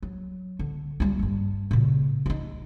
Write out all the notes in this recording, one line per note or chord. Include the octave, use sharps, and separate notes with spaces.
F#3
D3
G3 F4
G2 F4
A#2 C#3
C4 D#4